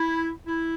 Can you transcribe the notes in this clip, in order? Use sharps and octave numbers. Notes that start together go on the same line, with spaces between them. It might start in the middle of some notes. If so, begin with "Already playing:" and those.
Already playing: E4
E4